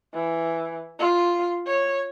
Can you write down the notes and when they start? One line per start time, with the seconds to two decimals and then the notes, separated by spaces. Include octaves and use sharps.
0.15 E3
0.99 F4
1.67 C#5